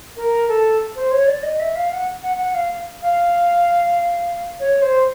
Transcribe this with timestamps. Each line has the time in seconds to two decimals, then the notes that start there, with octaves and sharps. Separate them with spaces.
0.16 A#4
0.48 A4
0.96 C5
1.11 C#5
1.27 D5
1.43 D#5
1.60 E5
1.75 F5
1.91 F#5
2.23 F#5
2.38 F#5
2.55 F5
3.02 F5
4.60 C#5
4.82 C5